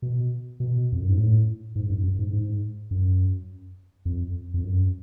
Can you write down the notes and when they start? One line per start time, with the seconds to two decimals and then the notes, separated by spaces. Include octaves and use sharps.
0.02 B2
0.60 B2
0.92 F2
1.00 F#2
1.09 G#2
1.17 A2
1.75 G#2
1.89 F#2
2.03 F#2
2.19 G#2
2.33 G#2
2.91 F#2
4.05 F2
4.54 F2
4.63 F#2